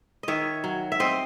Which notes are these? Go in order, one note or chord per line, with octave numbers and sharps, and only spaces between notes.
D#3 C#5 D#5 E5
F#3
E5
C4 C5 D#5